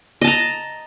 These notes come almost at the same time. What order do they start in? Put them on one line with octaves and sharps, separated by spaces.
D#5 A5 A#5